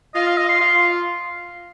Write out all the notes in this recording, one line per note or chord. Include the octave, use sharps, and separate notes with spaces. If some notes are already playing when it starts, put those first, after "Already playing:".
F4 D#5
F5
D#5
C6
F4